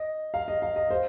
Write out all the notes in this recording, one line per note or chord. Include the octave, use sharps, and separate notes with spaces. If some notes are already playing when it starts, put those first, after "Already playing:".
Already playing: D#5
F5
D#5
F5
D#5
C5